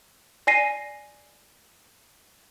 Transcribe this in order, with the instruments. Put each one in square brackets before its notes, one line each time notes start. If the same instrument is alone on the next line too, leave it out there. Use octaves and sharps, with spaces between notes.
[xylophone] D5 G#5 A#6 C7 D#7